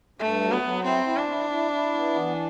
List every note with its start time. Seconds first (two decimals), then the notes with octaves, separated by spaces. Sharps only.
0.19 G2 A3
0.40 F#3
0.51 B3
0.63 F#3
0.84 C4 E4
1.06 E4
1.17 D4
1.28 E4
1.50 E4
1.71 E4
1.94 B3
2.15 E3